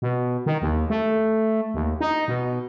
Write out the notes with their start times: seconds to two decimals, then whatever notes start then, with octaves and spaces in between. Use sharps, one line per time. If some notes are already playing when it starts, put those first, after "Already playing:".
0.02 B2
0.46 D#3
0.62 D#2
0.90 A3
1.74 D#2
2.01 D#4
2.28 B2